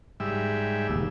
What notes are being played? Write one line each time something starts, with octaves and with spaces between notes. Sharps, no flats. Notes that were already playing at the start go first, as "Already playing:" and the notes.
G#2 G3 E5
E1 D#2